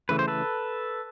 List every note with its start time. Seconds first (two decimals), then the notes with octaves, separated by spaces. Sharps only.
0.09 C#3 E3 A3 B4
0.19 C5
0.28 A4 B4